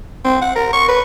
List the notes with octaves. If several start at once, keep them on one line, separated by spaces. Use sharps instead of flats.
C4
F#5
A#4
C#6
B4